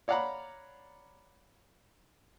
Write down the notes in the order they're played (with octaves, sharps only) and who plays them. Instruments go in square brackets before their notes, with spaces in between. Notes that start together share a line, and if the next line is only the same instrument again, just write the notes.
[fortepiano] C#5 D5 F5 F#5 A#5 B5